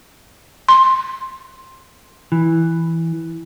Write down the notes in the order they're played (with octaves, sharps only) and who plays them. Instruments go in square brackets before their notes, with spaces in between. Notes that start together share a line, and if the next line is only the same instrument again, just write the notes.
[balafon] C6
[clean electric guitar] E3